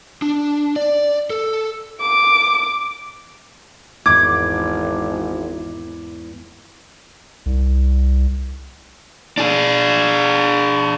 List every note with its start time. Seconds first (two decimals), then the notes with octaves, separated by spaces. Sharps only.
0.22 D4
0.76 D5
1.30 A4
2.01 D6
4.06 G#1 E2 G#2 E3 D6 G#6
7.46 C2
9.37 D4 G#4